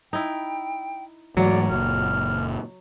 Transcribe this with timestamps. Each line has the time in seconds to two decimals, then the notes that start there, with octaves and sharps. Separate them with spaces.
0.13 D#4 E4 G5
1.37 G#2 E3 F#3 A3 D5
1.70 F#1 A#2 F6